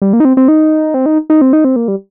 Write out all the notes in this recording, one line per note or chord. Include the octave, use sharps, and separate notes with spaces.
G3
A#3
D#4
C4
C4
D#4
C4
D#4
D#4
C4
D#4
C4
A#3
G3